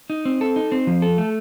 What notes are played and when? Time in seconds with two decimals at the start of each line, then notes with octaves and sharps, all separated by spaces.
0.10 D#4
0.25 C4
0.41 A4
0.56 D#4
0.72 C4
0.87 F3
1.02 A4
1.18 A3